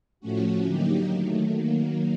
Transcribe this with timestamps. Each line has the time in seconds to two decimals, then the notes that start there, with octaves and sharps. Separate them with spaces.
0.20 A2 F3 A3 C#4 F#4
0.64 D3 F#3 A#3 D#4 G4
1.10 D#3 F#3 A3
1.53 D#3 F#3 A#3